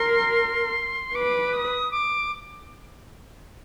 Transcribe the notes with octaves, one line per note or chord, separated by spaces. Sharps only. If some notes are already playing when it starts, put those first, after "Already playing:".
Already playing: A#4 C6
B4 D6
D#6
D6